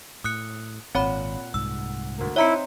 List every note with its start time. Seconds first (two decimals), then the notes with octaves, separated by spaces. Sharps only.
0.24 A2 D#6 F#6 C#7
0.95 G#1 A#2 C4 C#5 F#5 B5
1.54 C2 G#2 E6
2.18 D2 A#3
2.36 C4 D#4 E4 C#5 E5 A#5 C#7